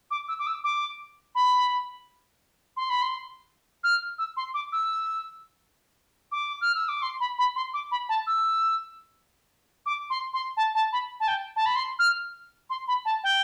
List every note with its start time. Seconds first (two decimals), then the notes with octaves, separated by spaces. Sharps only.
0.11 D6
0.28 E6
0.39 D6
0.47 E6
0.64 D6
1.35 B5
2.77 C6
2.90 B5
3.02 C6
3.84 F6
4.19 E6
4.37 C6
4.54 D6
4.72 E6
6.32 D6
6.61 F6
6.75 E6
6.89 D6
7.02 C6
7.20 B5
7.38 B5
7.56 C6
7.74 D6
7.91 B5
8.09 A5
8.27 E6
9.86 D6
10.10 C6
10.33 C6
10.57 A5
10.75 A5
10.92 B5
11.20 A5
11.28 G5
11.56 A5
11.66 B5
11.76 C6
11.99 F6
12.70 C6
12.88 B5
13.05 A5
13.24 G5